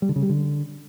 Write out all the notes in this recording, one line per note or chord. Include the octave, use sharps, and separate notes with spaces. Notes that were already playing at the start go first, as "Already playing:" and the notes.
G3
D3
C#3
G3
D3